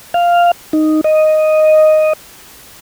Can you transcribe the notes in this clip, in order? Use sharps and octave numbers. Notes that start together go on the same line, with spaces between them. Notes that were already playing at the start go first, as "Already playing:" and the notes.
F5
D#4
D#5